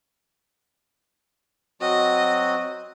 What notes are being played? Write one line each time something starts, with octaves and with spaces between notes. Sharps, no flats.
F#3 C4 F#4 D#5